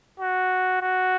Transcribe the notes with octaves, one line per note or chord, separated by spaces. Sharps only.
F#4
F#4